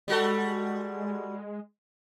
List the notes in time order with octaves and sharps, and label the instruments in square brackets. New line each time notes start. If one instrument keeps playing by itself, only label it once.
[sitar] G3 F#4 A4 [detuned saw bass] G#3